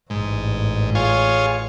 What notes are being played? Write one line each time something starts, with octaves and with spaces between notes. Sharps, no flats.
A1 G#2
F4 G#4 C#5